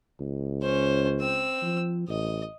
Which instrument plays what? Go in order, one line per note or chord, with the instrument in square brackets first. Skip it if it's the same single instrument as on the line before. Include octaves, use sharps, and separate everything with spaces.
[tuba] C#2
[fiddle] C#4 C5
C4 E6
[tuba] F3
[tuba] A1 [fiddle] D#5